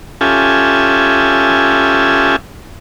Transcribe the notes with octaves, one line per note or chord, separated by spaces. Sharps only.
C#4 F4 G4 A4 E5 G#5